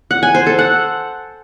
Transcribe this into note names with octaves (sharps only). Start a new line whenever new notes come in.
F#5
G#5
C5
A4
F#5